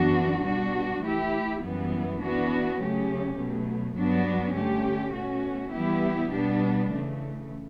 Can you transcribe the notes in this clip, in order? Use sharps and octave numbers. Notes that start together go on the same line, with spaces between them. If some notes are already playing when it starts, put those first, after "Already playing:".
Already playing: F#2 E3 B3 D4 F#4
B2 G3 D4 F#4
E3 A3 E4 G4
F#2 E3 G3 B3
E3 B3 D4 F#4
C#3 F#3 A3 C#4 G4
B2 F#3 A3
G2 F#3 B3 D4 F#4
D3 A3 C#4 G4
B2 A3 C#4 F#4
E3 G3 B3 E4 G4
B2 G3 B3 D4
C#3 E3 A3